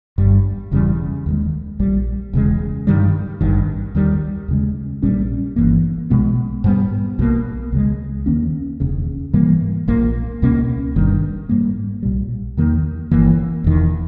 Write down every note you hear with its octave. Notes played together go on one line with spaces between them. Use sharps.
G1 G2 G3
E1 E2 C#3 G3
D#2 D#3 G#3
A#1 A#2 G3
E1 E2 C#3 G#3
G2 D#3 G3
G#1 G2 D#3
D#2 D#3 G3
D#2 C#3 G#3
A#1 A#2 G3 C#4
G1 G2 E3 A#3
B1 B2 G#3 B3
G#2 G3 B3
B1 B2 G3 A#3
C#2 C#3 G#3
D#2 D#3 A#3 C#4
E1 D#2 C#3
G#2 E3 G3 A#3
A#1 A#2 A#3
C#2 B2 A#3 C#4
G1 G2 D#3
G#2 G3 A#3
B1 A#2 G3
E2 D#3 A#3
G1 G2 E3 A#3
E1 E2 D#3